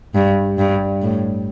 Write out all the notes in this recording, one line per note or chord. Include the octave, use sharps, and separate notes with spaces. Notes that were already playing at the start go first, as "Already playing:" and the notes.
G2
G2
A2